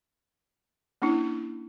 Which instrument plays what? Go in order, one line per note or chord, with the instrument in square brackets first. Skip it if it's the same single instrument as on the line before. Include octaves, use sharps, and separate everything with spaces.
[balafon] A#3 C#4 D4 E4